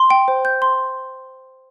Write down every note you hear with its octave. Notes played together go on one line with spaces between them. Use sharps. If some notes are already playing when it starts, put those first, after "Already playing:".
Already playing: C6
G5
C5
G6
C6